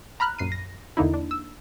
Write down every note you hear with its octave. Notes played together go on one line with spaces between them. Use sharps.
A#5 B5 F6 F#6
A#1 F#2 C7 D#7
A#6
E2 D3 A#3 D#4 E4
D4
E6